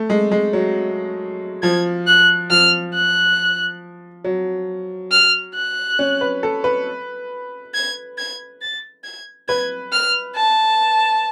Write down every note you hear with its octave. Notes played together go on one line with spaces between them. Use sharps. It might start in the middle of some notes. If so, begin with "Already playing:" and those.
Already playing: A3
G#3
G#3
F#3
F3 G#6
F#6
F3 F6
F#6
F#3
F6
F#6
C#4
B4
A4
B4
G#6
G#6
A6
G#6
B4 G#6
F6
A5